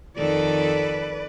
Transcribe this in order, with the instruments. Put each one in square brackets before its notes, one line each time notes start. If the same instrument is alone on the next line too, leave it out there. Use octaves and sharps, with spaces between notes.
[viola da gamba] F2 D#3 A4 [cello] B4 D5